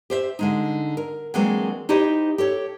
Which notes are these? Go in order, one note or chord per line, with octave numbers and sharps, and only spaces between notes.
G4 C5 E5
D3 G#3 D#4
A#4
E3 F#3 G#3 A#3 C4 D4
D#4 E4 G4 C5 D#5
G4 A4 C#5